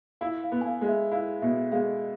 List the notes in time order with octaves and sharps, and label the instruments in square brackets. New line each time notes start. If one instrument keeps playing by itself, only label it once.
[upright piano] E4 [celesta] F5
[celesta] F5
[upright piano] B3
[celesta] G#5
F5
[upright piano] G#3
[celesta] E5
[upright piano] E4 [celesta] F5
[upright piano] B2 [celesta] E5
[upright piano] G#3 [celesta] F5